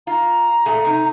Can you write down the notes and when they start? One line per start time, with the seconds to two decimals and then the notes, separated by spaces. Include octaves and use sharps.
0.07 F4 A#5
0.66 A#2 A3 G#4
0.85 C3 D#4